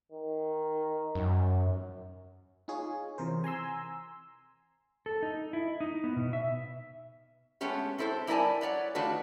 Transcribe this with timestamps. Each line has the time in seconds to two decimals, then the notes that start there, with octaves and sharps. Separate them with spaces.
0.12 D#3
1.15 F#2
2.68 D#4 F4 G#4 C#5
3.18 C3 E3 A#4 C5
3.44 G#5 A#5 C6 E6
5.06 A4
5.23 D#4
5.53 E4
5.80 D#4
6.04 B3
6.16 B2
6.33 E5
7.61 G#3 A3 B3 C#4 G4
7.98 C4 E4 A4 B4 C5
8.27 G3 E4 A#4 D5 G#5 A5
8.61 B4 C#5 D5 F#5
8.95 D#3 A3 D4 F4 F#4 B4